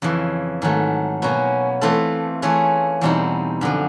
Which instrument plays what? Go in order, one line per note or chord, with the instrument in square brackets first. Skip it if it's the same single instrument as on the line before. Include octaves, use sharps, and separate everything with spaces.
[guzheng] F2 C#3 E3
G#2 D#3 F#3 A3
B2 F#3 A#3 C#4
E3 A3 C4 F4 A4
E3 A3 C#4 F4 G#4
E2 B2 G3 C4 D#4
F#2 D3 F3